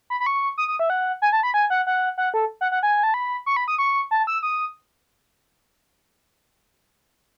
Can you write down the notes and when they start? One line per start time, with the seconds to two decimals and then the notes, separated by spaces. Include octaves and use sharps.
0.10 B5
0.20 B5
0.26 C#6
0.58 D#6
0.68 D#6
0.79 E5
0.90 F#5
1.22 G#5
1.33 A5
1.43 B5
1.54 G#5
1.70 F#5
1.87 F#5
2.18 F#5
2.34 A4
2.61 F#5
2.72 F#5
2.83 G#5
3.03 A5
3.14 B5
3.46 C#6
3.56 B5
3.68 D#6
3.78 C#6
4.11 A5
4.27 E6
4.43 D#6